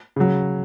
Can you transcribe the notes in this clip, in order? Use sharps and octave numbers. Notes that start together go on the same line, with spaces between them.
C#3 F#3